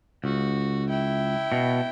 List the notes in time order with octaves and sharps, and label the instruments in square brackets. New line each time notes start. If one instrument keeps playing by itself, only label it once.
[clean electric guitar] C#2 [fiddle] F#4
[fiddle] E4 G5
[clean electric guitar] B2